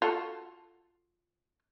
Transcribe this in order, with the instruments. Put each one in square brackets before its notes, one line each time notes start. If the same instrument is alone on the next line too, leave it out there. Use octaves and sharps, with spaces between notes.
[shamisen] F4 F#4 A4